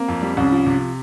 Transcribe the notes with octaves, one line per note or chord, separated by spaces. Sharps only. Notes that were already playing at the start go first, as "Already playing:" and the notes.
Already playing: A#3 C4
F2
G3
C2 C#4
F3
C3